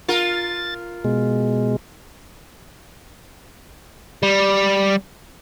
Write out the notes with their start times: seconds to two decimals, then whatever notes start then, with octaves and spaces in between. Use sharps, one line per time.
0.09 F4 A#4 A6
1.04 B2 G#3
4.23 G3